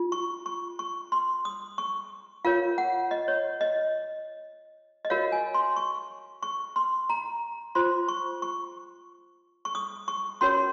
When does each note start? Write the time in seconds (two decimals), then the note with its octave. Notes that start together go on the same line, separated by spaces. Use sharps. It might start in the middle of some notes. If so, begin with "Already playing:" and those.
Already playing: F4
0.12 C#6
0.46 C#6
0.79 C#6
1.12 C6
1.45 D#6
1.78 C#6
2.45 F4 A#4 C#5 F5
2.78 F#5
3.11 D#5
3.28 C#5
3.61 D#5
5.05 D#5
5.10 F#4 A#4 C#5 F5
5.32 G#5
5.54 C6
5.76 C#6
6.43 C#6
6.76 C6
7.10 A#5
7.75 F4 C5 C6
8.08 C#6
8.42 C#6
9.65 C#6
9.75 D#6
10.08 C#6
10.41 C#4 F#4 A#4 C#5 C6